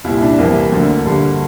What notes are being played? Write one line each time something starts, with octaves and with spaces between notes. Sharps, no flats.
C2 A#2 E4
D4
C2 C3 E3 A#3
D2 D3
G2 D3